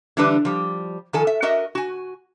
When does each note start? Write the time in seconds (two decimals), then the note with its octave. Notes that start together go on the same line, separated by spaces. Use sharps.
0.17 D3 E3 G3 D4 B4
0.45 F3 G3
1.13 D#3 F3 A4 G#5
1.27 E5
1.42 F#4 A#4 D#5 E5
1.75 F#4 G#5